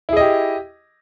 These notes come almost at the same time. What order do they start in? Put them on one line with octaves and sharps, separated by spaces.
E4 G#4 D#5 G4